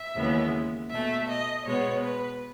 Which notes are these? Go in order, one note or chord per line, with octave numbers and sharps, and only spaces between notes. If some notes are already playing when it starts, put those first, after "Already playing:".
Already playing: E5
D#2 C#3 E3 G#3 B3
B2 A3 E5
D#5
B2 G#3 B3 C#5
B4